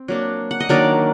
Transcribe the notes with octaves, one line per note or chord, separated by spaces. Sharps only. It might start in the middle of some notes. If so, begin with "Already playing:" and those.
Already playing: C4
F#3 A#3 D4
F#5
D#5
D#3 F#3 A#3 D4 A#4 D5